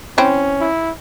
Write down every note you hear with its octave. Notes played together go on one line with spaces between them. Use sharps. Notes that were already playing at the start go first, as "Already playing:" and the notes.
E3 C4 C#4
E4